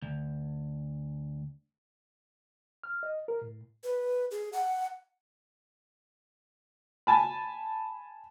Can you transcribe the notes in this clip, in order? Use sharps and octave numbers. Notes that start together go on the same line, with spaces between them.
D2
F6
D#5
A#4
A2
B4
G#4
F#5
G#5 A5 B5